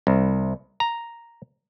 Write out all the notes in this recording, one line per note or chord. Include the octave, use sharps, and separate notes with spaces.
C2
A#5